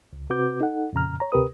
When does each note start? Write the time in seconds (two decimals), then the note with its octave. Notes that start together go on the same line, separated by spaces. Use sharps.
0.13 C#2
0.30 C3 C4 F#4 B4 D6 G6
0.61 D#4 A4 F#5
0.93 F2 A#2 C#3 A#5 F6
1.20 C#5 A#5
1.32 D2 C3 G4 A#4 B4 D#6